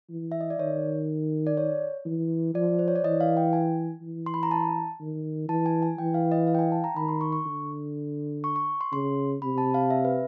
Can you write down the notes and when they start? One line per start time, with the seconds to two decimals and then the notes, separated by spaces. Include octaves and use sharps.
0.10 E3
0.32 E5
0.41 D#5
0.50 D5
0.59 D#3 C#5
1.47 D5
1.57 C#5
2.06 E3
2.55 F3 D5
2.79 C5
2.88 C#5
2.95 D5
3.04 E3 D#5
3.21 F5
3.37 G5
3.53 G#5
4.02 E3
4.26 C6
4.34 B5
4.43 A#5
4.51 A5
5.00 D#3
5.49 E3 A5
5.66 G#5
5.82 G#5
5.98 E3 G5
6.14 F5
6.32 D#5
6.47 F5
6.55 G5
6.59 G#5
6.72 A5
6.84 A#5
6.96 D#3 B5
7.09 C6
7.21 C#6
7.32 C#6
7.46 D3
8.44 C#6
8.56 C#6
8.81 C6
8.92 C#3 C6
9.42 C3 B5
9.58 A5
9.74 F5
9.90 E5
10.05 B4